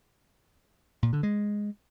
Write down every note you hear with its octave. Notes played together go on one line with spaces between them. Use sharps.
A#2
D3
G#3